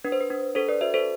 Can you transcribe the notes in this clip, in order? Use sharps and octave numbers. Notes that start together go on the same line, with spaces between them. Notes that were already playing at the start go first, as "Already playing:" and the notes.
D4 B4
C5
B4
D4
D4 A4 C5
B4 D5
F#4 C5 E5
A4 C5